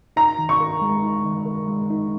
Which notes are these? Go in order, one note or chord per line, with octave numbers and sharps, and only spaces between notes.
D#4 A#5
D#3
C#6
A#4
G#3
D#4
D#3
A#4
G#3
D#4